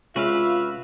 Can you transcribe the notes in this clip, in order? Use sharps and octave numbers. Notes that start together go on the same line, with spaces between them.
C3 G#3 C#4 F4 F#4 B4 E5 F5